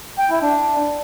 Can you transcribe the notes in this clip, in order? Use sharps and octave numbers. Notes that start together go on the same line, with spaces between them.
G5
E4
D4